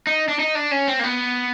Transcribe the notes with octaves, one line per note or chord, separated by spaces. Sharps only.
D#4
D4
D#4
D4
C#4
C4
A#3
B3